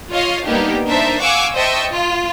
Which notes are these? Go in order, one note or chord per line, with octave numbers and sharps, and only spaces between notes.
F4 C#5 D#5 F5
G3 A#3 B3 D4 D#4 G4
D4 D#4 A#4 C5 E5 A5
F5 F#5 G#5 C#6 D6 E6
C5 D#5 E5 G5 A5 C#6
F4